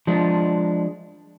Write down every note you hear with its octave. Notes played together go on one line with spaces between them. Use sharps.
F3 G#3 D4